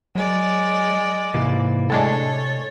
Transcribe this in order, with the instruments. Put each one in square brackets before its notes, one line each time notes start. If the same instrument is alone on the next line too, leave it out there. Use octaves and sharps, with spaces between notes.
[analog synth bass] F#3 [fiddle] G#3 D5
[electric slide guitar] G#2 E3 A#3 [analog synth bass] C3
[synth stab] A2 G#3 D4 [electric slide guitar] A4 [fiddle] C#5